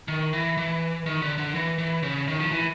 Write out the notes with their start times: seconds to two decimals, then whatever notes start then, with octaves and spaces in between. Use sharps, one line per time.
0.08 D#3
0.33 E3
0.58 E3
1.06 D#3
1.22 D3
1.38 D3
1.55 E3
1.78 E3
2.03 C#3
2.27 D#3
2.40 F3
2.51 E3